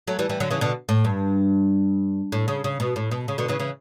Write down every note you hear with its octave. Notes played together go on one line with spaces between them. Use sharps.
F#3 A3
E3 G3
E3 G3
D3 F#3
C#3 E3
B2 D3
A2
G2
A2
C#3
C#3
B2
A2
B2
C#3
B2 D3
C#3 E3
C#3 E3